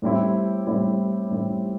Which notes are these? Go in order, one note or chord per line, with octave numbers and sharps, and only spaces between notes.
A2 G3 C4 E4
A2 G3 C4 E4
A2 G3 C4 E4